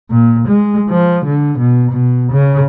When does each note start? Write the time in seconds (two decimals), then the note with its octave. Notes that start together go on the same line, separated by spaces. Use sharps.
0.11 A#2
0.48 G#3
0.90 F3
1.25 D3
1.59 B2
1.91 B2
2.32 C#3